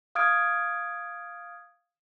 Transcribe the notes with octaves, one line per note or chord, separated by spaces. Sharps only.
F5 D#6 F6 G#6 D7